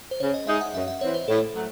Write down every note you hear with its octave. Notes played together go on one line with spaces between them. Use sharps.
C5
C#3 C#5
D#5
G#3 D#4 G#4 E5
F#5
F#2 E5
E5
E3 C4 C#5
C5
A2 A4
F#3 A3